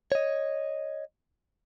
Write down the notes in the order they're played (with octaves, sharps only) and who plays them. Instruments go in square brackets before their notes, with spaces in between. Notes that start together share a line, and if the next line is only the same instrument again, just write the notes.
[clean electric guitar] C#5 D#5